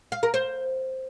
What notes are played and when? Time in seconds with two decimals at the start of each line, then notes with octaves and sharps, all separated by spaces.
0.12 F5
0.23 A#4
0.34 C5